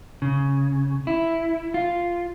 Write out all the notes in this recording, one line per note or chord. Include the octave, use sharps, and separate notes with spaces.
C#3
E4
F4